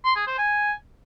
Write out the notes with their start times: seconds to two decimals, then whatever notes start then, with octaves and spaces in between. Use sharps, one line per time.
0.05 C6
0.16 G#4
0.27 C5
0.38 G#5